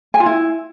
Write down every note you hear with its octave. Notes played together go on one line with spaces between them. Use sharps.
G#5
F4
E4